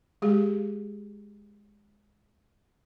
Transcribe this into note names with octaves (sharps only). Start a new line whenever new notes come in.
G#3 G4 G#4